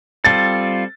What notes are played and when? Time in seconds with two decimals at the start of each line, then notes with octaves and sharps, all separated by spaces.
0.24 G3 C4 F4 A4 A6